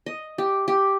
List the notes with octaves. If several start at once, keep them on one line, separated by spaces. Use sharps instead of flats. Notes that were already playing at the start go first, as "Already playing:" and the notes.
D#5
G4
G4